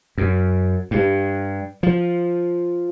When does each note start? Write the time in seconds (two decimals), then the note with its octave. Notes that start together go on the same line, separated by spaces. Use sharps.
0.18 F#2
0.91 G2
1.83 F3